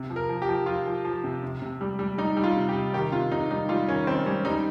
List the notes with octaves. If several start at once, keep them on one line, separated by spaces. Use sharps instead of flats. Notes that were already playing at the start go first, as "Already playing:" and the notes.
Already playing: C3
F3
A#4
F3
G4
F3
F3 F4
F3
F3
C3
C3
C3
G3
G3
G3 D#4
G3
F4
C3
G4
C3
D#3 G4
C3 F4
C3 D#4
G3 D#4
G3 F4
D#3 C#4
D#3 C4
G3 C#4
G3 D#4